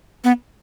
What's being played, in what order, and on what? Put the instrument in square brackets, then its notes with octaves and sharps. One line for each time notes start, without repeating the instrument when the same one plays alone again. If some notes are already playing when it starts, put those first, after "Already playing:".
[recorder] B3